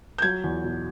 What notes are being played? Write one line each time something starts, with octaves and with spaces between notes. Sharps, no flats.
G6
F#3 G#6
E2
B2